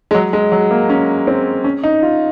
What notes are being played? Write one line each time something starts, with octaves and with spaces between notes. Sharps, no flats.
G#3
F#3
G#3
F#3
A#3
C#4
C4
C#4
D#4
F4